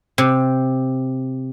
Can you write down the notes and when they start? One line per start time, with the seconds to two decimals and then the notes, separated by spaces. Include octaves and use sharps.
0.18 C3